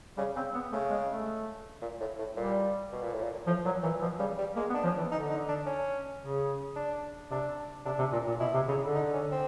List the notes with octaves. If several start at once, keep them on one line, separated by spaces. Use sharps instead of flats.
C#3 G3
C#3 C4
B3
C#3 A3
G#3
A3
A#2
A2
A2
A#2 G3
B2
A#2
A2
A#2
A2 F3
A#2 F#3
A#2 E3
B2 F3
C#3 G3
G3
G#3 A#3
B3
D4
F3 C#4
E3
D3 D#4
D#4
D4
C#4
C#3
D4
C3 D4
C3 D4
C3
A#2
A#2
B2 E4
C3
C#3
D3
D#4
C#4
C4